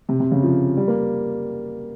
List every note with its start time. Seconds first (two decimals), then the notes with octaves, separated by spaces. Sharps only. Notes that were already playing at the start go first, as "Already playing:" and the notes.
0.09 C3
0.20 C3
0.32 C#3
0.43 F3
0.77 G3
0.88 A#3